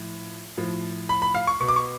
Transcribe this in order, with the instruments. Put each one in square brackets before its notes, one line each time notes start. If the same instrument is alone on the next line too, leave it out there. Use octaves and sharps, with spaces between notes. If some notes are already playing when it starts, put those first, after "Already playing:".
Already playing: [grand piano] A2 F3
A2 F3
B5
B5
F5
C#6
B2 C#6
D6
C#6